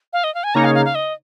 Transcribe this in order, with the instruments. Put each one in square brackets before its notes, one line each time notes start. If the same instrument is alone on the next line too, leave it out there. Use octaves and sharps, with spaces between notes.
[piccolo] F5
D#5
F5
G#5
[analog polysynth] C#3 A#3 D#4 C#5 [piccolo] A#5
[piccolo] F5
F5
F5
D#5